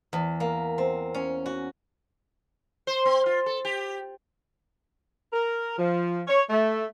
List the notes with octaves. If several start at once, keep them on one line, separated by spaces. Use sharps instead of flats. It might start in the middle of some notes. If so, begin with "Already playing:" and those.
E2
A#3
C4
C#4
F#4
C5
C4
F4
A4
G4
A#4
F3
C#5
A3